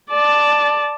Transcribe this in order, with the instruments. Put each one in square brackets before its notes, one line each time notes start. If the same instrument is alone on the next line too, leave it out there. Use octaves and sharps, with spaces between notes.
[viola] D5 A5